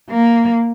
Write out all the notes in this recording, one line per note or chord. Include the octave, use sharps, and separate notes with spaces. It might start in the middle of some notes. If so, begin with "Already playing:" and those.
A#3